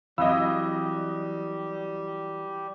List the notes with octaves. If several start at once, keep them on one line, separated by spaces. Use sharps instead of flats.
E3 F#3 G3 C4 D#5 F5 B5 E6